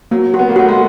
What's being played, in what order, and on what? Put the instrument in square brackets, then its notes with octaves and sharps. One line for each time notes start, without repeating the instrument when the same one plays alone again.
[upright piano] F#3 [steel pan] A#3
[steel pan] F#4
[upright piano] B3
A#3
[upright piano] A3 [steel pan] F#4
[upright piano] G#3